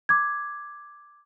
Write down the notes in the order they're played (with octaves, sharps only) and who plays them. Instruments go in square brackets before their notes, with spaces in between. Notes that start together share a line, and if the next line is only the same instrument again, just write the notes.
[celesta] D6 G#6